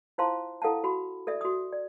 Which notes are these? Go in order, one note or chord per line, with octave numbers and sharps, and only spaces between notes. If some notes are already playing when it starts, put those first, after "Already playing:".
E4 F4 C5 F5 A5 C6
E4 A4 F5 F#5 A5
F#4 B5
A4 D5 E5
F#4 D#6
D5